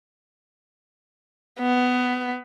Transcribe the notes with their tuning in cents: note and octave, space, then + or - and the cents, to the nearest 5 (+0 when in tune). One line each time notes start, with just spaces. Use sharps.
B3 +15